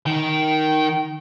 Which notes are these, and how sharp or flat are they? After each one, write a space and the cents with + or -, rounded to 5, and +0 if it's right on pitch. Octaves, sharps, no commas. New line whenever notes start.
D#3 +5 G5 -20